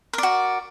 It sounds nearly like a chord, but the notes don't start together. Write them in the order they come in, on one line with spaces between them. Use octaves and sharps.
A#4 D5 F#4